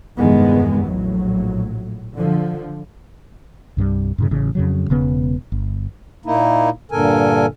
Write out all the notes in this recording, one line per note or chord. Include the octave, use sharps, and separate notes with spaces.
F1 E2 G2 D#3 G#3 B3
A#1 A2 F#3
D3 F3
C2 G2 F3 G3
F#2 A2 C#3
A1 C#3
F2 C#3 F#3
E1 C#3 B3
G1
A#2 A#3 D#4 E4
G2 A#2 D3 A4 A#4 G#5